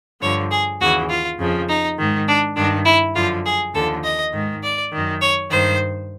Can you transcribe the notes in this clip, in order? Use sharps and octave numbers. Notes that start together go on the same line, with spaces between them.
G2 D3 F3 C#5
G#4
D#2 C#3 E3 F#4
F4
F2 C#3 F3
D#4
G#2 D#3
D4
G2 D#3 D4
E4
F#2 D3 F3 F4
G#4
D#2 D3 F3 A4
D#5
G#2 D#3
D5
F#2 D#3
C#5
G2 D#3 C5